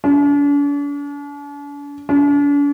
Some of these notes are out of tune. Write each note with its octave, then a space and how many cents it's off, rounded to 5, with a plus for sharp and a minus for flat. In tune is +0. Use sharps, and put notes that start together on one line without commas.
D4 -45
D4 -45